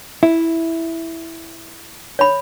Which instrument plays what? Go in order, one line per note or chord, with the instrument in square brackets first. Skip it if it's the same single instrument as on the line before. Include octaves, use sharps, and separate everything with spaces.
[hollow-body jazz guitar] E4
[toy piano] C#5 B5